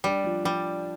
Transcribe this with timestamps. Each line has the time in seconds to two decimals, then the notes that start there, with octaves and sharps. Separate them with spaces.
0.04 G3 D4
0.24 F3
0.44 F3 G3